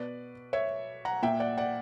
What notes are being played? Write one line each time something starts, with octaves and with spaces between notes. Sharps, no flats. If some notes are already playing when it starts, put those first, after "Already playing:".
Already playing: B2 B4 D5
C#5 E5
F#5 A#5
A#2 E5 G5
D5 F#5
D5 F#5